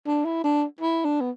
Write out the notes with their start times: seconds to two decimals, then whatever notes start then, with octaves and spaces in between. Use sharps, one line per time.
0.06 D4
0.25 E4
0.44 D4
0.81 E4
1.05 D4
1.21 B3